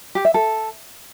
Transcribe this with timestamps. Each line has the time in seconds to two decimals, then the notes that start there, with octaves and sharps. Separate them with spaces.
0.15 G4
0.25 E5
0.34 A4